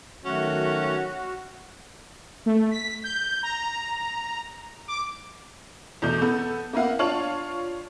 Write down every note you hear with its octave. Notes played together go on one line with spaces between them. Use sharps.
D#3 F#3 A3 C#4 F#4
A3
B6
G6
A#5
D6
E2 B2 A3 G6
B3 A4
A#3 B3 E4 F5 F#5
D4 F4 C#5 A5 F6 F#7